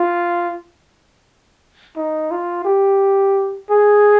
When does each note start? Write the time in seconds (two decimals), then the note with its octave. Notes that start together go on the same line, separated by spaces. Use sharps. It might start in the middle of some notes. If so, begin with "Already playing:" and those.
Already playing: F4
1.96 D#4
2.31 F4
2.65 G4
3.70 G#4